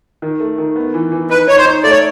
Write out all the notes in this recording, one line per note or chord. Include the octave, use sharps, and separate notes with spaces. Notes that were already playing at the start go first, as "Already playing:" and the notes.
D#3
A3
D#3
B3
E3
E3
D#4 B4
D#4 C#5
C5
D#4
A3 D5
C#5